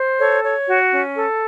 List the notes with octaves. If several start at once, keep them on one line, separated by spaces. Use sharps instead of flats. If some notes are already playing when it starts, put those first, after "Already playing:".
Already playing: C5
A4 C#5
C#5
F#4
C#4
A4